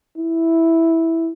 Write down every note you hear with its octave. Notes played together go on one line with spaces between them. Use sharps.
E4